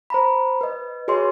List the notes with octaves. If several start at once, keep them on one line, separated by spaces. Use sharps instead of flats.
C5 A#5 B5
B4 D#5
F#4 G#4 B4 C#5 D#5 C6